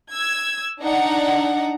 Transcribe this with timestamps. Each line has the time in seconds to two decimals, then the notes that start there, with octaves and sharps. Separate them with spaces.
0.11 E6 G#6
0.82 D4 D#4 F#5 A#5